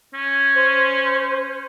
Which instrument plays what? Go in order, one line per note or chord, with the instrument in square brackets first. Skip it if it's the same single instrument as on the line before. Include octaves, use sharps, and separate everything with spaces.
[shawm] C#4
[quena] C5